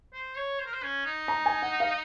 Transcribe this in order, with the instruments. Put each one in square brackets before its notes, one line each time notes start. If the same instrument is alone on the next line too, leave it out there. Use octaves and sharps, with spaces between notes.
[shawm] C5
C#5
C5
A#4
C5
C#4
D#4
[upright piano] A#5
G#5
F#5
F5